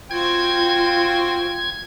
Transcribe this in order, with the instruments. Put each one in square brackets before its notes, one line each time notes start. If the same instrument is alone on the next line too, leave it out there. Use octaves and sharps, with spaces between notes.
[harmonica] C4 F#4 G5 [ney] F4 [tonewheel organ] G#6